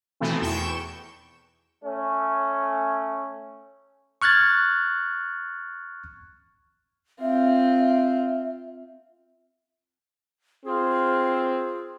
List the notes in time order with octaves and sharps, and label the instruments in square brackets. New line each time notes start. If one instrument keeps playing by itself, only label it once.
[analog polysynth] B2 D#3 E3 A3 B3 C4
E2 G5 C#6 G6 E7
[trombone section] A3 C#4
[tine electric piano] C#6 F6 F#6 G#6 A6
[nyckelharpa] C4 F4 [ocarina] E5
[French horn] C4 [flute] F4 [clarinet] G#4